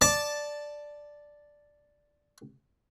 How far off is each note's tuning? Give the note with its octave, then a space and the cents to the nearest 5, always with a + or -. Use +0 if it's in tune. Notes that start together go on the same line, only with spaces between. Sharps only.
D5 +0 A5 +0